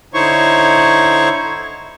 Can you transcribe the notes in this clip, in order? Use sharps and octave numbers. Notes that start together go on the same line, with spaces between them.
D3 D#4 E4 C5 C#5 C#6